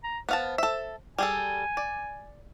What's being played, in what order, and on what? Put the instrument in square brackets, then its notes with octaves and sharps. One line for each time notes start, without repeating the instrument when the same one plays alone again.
[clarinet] A#5
[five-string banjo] B3 F5 A5 [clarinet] C5
[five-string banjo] A4 E5
[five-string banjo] G3 G#4 A4 [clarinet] G#5
[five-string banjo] D5